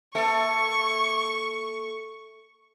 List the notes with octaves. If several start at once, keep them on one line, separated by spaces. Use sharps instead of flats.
A#3 A4 E5 C#6